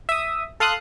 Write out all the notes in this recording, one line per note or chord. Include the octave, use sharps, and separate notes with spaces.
E5 D#6
A4 F5 C6 D#6 F#6